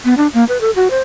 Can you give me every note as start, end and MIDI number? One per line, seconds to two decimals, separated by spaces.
0.05 0.14 59
0.17 0.28 62
0.34 0.44 58
0.49 0.58 71
0.61 0.71 69
0.76 0.88 66
0.90 1.00 72